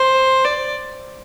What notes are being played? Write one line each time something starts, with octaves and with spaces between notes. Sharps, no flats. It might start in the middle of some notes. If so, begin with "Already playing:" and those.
Already playing: C5
D5